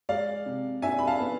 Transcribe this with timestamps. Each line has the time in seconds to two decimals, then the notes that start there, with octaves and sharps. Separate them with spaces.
0.09 G#3 D5 F5
0.46 C3
0.82 D4 E5 G#5
0.99 B5
1.07 F5 A5
1.20 B3